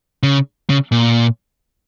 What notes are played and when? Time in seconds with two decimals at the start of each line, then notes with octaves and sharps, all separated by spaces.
0.23 C#3
0.70 C#3
0.92 A#2